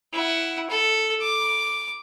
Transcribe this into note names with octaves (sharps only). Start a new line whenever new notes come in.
E4 F#5
A4
D6